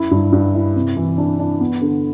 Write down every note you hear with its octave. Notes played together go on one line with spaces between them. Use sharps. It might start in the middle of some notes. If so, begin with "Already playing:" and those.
Already playing: F#2 E4
G2
G2
E4
C3
E3
D4
D4
B3
D3